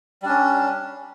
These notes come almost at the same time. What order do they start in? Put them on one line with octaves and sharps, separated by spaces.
G3 D4 C#4